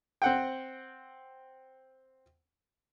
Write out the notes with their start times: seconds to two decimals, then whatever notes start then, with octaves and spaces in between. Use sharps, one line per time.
0.22 C4 F#5 G5